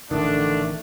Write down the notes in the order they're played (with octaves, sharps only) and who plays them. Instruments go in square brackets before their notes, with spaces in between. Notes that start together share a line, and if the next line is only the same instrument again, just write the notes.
[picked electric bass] A1 D#3 [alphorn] D3 [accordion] A3 [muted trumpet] D4